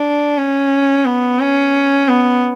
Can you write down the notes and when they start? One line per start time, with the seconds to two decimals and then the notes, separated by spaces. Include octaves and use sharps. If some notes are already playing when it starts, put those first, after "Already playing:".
Already playing: D4
0.38 C#4
1.06 B3
1.40 C#4
2.08 B3